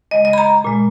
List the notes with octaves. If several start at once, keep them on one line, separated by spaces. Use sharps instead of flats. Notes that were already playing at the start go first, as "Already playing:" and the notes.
C#3 G#3 D#5
D#5
B5
A#5
A#2 G#3